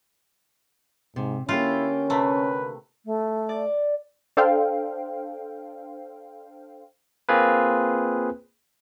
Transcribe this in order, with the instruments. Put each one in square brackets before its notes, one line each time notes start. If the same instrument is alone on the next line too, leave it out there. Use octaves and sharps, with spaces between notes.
[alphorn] G#2 [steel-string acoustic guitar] C3
[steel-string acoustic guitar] D3 A#3 G4 [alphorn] C#4 [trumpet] E4 [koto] F4
[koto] C3 A3 [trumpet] B4
[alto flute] A3
[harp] D5
[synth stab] D4 A4 C5 F5 G5
[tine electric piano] A#3 C4 F4 G#4 B4